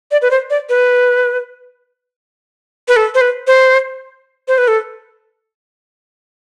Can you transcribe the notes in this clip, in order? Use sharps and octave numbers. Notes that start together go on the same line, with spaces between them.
D5
B4
C5
D5
B4
B4
A4
C5
B4
C5
C5
B4
A4